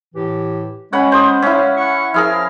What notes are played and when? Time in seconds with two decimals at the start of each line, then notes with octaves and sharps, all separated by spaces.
0.15 A2 E3 G4
0.93 G#3 C#4 C#5 F#5 B5
1.12 C5 D#6
1.42 G#3 C#4 E4 F5
1.77 F#5 C#6
2.14 F3 E4 G#4 A#4 F5 F6